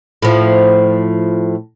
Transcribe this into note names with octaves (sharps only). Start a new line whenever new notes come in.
A2 F3